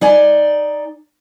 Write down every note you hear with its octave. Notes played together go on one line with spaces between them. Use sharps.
D#4 D5 G#5